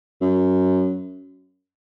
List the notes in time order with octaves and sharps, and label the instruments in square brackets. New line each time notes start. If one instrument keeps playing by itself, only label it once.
[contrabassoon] F#2